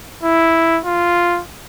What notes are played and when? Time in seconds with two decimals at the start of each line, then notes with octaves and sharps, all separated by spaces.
0.23 E4
0.85 F4